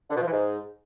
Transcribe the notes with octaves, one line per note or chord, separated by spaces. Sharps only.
D3
B2
F3
E3
G#2